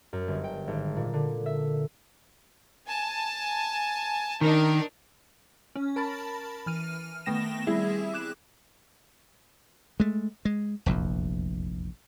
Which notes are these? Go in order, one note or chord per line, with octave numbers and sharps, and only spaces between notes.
F#2
G1
G5
G#1
A#2
D3
E5
G#5 A5
D#3 D4 D#4 A#4
C#4
A#4 A5 B5 A6
E3 F6 D#7
D#3 A3 B3 G5 A#6 E7
G3 C4 E4 G#4 E5
D6 F#6 E7
G#3 A3
G#3
F1 A#1 E2